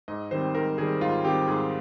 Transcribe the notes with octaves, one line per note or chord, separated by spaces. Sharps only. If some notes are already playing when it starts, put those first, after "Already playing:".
G#2 D#5
D#3 G3 C4 C5
G#2 A#4
D#3 G3 C4 G#4
G#2 F4
D#3 G3 C4 G4
G#2 G#4